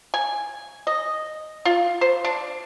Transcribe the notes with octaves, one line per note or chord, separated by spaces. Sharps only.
G#5
D#5
F4
C5
D4